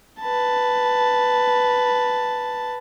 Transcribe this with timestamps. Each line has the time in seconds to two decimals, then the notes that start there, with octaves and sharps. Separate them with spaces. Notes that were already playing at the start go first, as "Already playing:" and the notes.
0.22 B4 A5